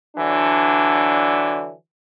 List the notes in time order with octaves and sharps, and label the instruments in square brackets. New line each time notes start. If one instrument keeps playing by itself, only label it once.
[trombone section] D3 E3 F#3 D4